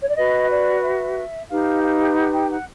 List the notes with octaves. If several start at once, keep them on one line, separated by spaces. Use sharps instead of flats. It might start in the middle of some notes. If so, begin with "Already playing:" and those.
C#5
D5
F#4 B4 D#5
D5
E5
D#4 G4 B4 F5
F5
F#5
G5
F#5